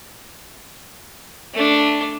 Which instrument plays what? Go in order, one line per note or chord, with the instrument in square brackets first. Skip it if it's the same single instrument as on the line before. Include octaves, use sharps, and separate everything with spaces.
[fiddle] A3 D4